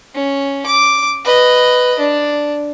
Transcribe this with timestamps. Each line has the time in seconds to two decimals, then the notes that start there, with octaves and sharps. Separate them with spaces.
0.15 C#4
0.66 D6
1.25 B4 D#5
1.99 D4